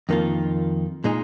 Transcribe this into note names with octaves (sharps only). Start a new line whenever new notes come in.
F2 D#3 A#3 F4
A#2 G#3 D#4